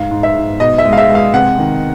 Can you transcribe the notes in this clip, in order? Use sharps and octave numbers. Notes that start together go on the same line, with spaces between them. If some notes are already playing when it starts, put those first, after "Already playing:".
Already playing: G#2 F5
G#2
E5
G#2
B2 D#5
E5
G#3
F5
E5
G#3
F5
C3 F#5
D#3